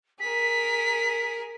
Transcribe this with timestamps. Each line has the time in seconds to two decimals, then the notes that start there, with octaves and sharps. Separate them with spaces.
0.20 G#4 A#4 B6